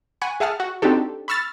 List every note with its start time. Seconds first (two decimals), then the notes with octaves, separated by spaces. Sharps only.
0.22 F#5 G#5 B5 C#6 F#6
0.40 G#4 E5 F#5 A5 F6
0.60 F#4
0.82 C4 D4 D#4 F#4 G4 A4
1.28 B5 C#6 E6 F6 A6